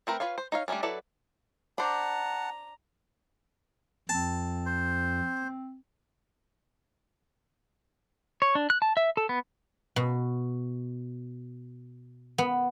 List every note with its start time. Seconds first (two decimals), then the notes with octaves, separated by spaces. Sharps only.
0.07 A3 C4 A#4 B4
0.20 F4 B4 C#5 F5
0.38 C5
0.52 D#4 C#5 F5
0.68 G3 A3 A#3 C#4 D4
0.83 F#3 E4 A4 B4 D5
1.78 D4 C5 F#5 A5 A#5
4.09 F2 C4 A5
4.66 C5
8.42 C#5
8.55 D4
8.70 F#6
8.82 A5
8.97 E5
9.17 A4
9.29 B3
9.96 B2
12.38 B3